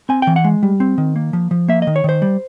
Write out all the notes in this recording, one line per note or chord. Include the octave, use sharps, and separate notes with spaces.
C4 G#5
E3 G5
F#5
G#3
G3
C4
D#3
A#3
F3
F3
A#3 E5
D#3 D#5
C#5
D#3 C5
G3